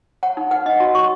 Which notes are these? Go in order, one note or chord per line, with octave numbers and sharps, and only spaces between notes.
C#5 F#5
D#4
B4 F#5
D#4 D#5
F#4 C#5
F#4 C#6